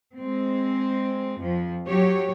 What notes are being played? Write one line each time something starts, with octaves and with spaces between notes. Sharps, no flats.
G#3 C4
F2 F3
F#3 G4 C#5